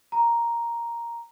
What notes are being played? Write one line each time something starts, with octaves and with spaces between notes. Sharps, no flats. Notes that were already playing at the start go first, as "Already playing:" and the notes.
A#5